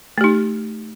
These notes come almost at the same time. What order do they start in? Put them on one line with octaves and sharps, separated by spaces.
A3 G4 D#4